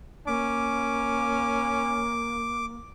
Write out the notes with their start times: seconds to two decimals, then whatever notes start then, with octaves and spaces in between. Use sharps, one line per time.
0.27 A#3 C#4 D6